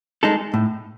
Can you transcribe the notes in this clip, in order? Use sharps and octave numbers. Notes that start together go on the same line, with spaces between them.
G#3 D#4 A4
A2